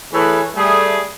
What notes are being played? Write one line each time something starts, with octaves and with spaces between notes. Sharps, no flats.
E3 A3 G#4 A4 B4 C#5
G3 A3 G#4